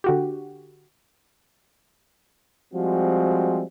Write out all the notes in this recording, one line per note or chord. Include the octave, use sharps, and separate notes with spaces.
D3 F#4 G4
F3 G3 G#3 C4 F#4